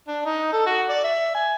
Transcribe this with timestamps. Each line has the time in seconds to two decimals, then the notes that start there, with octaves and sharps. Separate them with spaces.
0.08 D4
0.25 D#4
0.53 A4
0.66 F#4
0.89 D5
1.04 E5
1.35 G#5